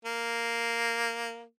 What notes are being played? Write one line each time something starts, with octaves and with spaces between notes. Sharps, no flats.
A#3